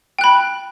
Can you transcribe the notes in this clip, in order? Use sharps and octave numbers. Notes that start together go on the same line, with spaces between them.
G5 B5 F#6